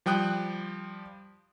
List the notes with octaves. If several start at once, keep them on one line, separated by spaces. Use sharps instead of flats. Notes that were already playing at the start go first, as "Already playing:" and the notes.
F3 G3 G5 D#6 F#6